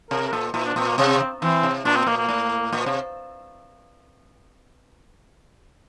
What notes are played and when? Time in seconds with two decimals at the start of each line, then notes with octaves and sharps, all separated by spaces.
0.11 C3 A#4
0.28 A#4
0.32 A#2 A4
0.54 A#2 E4
0.65 D4
0.76 A#2 C4
0.87 A#3
0.98 C3 C4
1.41 E3 C4
1.63 C3
1.85 A#2 D4
1.96 C4
2.07 A#2 A#3
2.18 A#3
2.29 A2
2.73 A#2
2.86 C3